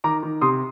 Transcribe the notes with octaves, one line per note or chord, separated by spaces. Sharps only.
D#3 A#5 D6
D#3
C3 C6 D#6